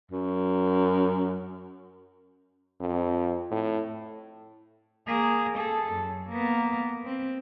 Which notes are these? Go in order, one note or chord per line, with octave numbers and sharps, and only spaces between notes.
F#2
F2
A2
A#3 G#4
G#4 A4
F#2
A#3 B3
C4